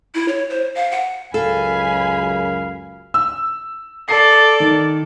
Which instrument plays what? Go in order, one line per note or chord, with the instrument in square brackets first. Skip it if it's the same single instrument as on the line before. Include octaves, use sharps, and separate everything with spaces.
[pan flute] E4
C#5
C5
F5
F#5
[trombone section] C#2 F#2 [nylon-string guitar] A4 [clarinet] F5 [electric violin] G#5 B5
[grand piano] E6
[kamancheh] A4 D5 [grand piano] C7
[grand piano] D#3